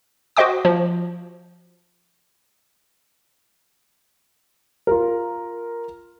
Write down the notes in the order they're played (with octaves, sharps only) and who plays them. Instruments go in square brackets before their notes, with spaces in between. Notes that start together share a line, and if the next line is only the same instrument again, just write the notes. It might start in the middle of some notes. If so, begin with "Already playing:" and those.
[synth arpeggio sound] F#4 C5 D#5 G5 D6
F3
[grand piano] F4 A#4